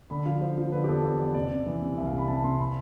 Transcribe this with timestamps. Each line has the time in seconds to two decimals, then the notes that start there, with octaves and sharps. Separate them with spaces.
0.10 D3 B5
0.26 F3 F5
0.41 F3 C5
0.58 F3
0.72 D3 B4
0.84 G4
0.88 E2 A4
1.04 E2
1.19 E2 D5
1.34 C3 D5
1.51 C3
1.66 E3
1.82 C3
1.97 C2 E5
2.07 F5
2.13 C3
2.18 B5
2.28 C3 A5
2.44 C3 C6
2.59 B5